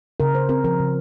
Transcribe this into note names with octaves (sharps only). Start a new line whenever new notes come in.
C#3 A#4
C#3 C5
C4 A#4
F3 A#4
C#3